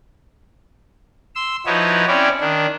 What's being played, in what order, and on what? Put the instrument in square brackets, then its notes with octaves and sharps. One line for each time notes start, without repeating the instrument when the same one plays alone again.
[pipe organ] C6 E6
F3 D#4 E4 F#4 B4 C#5
C4 C#4 E4 C#5 D5
D#3 D4